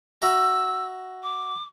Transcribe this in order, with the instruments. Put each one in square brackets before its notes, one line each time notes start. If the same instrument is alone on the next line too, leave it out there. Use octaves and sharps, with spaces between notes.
[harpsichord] F#4 E5 A#5 [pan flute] E6
[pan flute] D6